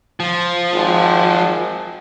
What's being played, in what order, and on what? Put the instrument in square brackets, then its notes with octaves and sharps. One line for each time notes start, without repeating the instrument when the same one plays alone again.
[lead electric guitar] F3
[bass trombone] G#1